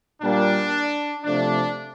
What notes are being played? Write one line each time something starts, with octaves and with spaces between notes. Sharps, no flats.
A#2 G3 A#3 D4
C3 F3 A3 D4